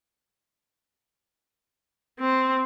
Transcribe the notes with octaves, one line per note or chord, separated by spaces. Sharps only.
C4